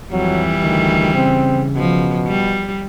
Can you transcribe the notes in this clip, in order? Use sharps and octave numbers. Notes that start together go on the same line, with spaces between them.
F2 E3 F#3 G3
D2 D#3
C#3 C4
B2 F3
G3